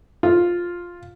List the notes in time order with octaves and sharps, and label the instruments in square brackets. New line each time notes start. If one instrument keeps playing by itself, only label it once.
[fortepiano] F4